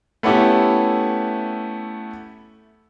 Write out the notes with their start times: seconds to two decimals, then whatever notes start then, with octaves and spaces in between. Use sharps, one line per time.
0.23 A3 B3 C#4 E4 G4 A4